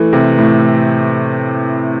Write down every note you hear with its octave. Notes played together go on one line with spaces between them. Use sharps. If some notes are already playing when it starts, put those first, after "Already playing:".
Already playing: E3 A3
C3
A2